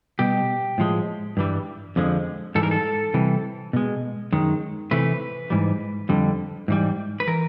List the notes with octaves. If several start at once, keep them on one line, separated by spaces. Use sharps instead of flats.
B2 G3 G4
A2 F3 G#3
G2 E3 G3
F2 D3 F3 G#3
G#2 E3 G3 A4
A#4
A4
C3 E3 G3
B2 G#3
F#2 D#3 G#3
C3 E3 A3 B4
G#2 E3 G3
F2 D3 G3
G#2 E3 G3
B4
E3 A#4